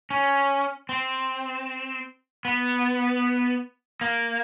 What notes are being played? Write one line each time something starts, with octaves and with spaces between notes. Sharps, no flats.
C#4
C4
B3
A#3